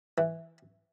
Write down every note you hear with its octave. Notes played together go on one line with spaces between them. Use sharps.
E3